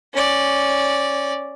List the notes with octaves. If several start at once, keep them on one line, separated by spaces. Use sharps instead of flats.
C#4 D5